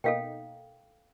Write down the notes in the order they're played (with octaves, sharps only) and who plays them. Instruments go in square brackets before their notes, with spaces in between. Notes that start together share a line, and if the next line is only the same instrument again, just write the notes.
[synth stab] B2 A#3 D#4 [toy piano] A4 F5 G5